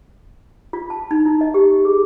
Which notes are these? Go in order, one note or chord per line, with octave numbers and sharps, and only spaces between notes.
F4
A5
D#4
E4
D#5
G4
G#4